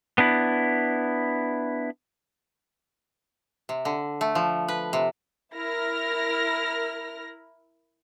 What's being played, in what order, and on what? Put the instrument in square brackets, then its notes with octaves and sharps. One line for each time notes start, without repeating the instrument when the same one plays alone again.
[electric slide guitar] B3 D4 E4
[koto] C3
D3
A3
F3
B4
C3
[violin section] E4 A#4 F6 A#6